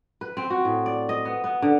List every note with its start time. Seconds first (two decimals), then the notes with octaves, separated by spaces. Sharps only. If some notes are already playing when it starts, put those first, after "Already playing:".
0.21 B4
0.37 C4
0.50 F#4
0.65 A2
0.86 D5
1.09 D#5
1.25 B3
1.44 B3
1.62 D3